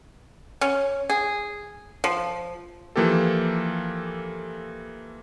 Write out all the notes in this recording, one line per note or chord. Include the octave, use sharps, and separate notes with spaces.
C#4
G#4
F3
E3 F3 A#3 G4 A4